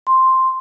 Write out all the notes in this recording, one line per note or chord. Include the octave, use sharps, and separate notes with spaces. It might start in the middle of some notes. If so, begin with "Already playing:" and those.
C6